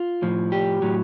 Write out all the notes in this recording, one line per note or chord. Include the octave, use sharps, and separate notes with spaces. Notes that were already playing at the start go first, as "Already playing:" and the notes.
Already playing: F4
A2 F3
G4
A2 F#3